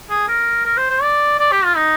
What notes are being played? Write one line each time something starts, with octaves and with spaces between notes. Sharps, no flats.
G#4
A#4
A#4
C5
C5
D5
D5
G4
F4
D#4